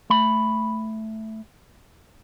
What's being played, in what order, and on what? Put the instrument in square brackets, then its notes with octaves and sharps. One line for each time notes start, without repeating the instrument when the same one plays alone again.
[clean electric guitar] A3 B5